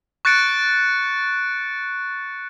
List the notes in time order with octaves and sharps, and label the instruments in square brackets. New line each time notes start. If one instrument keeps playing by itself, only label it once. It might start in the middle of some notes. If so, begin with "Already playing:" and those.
[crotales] C#6 F#6 A6 C#7 D7